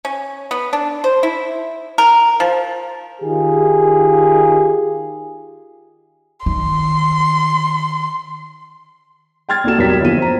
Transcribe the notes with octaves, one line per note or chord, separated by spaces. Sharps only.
C#4
B3
D4
C5
E4
A#4
F3
D#3 F4 G4 G#4
D#3 C6
G5 C6 F6 G#6 A6
C2 A#3 F#4 A4 E7
E1 F#3 G3 B3 A#4 B6
G1 D#2 F3 E4 D#7
C5 A#5